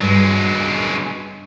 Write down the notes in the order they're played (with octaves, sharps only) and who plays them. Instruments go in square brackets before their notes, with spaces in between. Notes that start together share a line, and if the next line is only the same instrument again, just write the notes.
[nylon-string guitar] G2 [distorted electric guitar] F#3 G#3